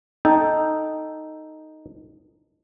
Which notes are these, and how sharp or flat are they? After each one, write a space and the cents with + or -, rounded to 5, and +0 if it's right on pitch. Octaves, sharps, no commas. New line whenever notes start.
D#4 +0 A4 +0 G5 +0